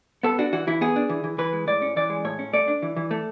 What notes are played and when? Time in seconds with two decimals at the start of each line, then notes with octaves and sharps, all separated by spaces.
0.23 B3 A4
0.39 D4 F#4
0.52 E3 F#4
0.67 E3 E4
0.81 B3 G#4
0.96 D4
1.09 E3
1.24 E3
1.38 E3 B4
1.53 G#3
1.67 A2 D5
1.82 C#4
1.96 E3 D5
2.10 G#3
2.24 A2 C#5
2.39 C#4
2.53 A3 D5
2.68 D4
2.82 E3
2.96 E3
3.11 A3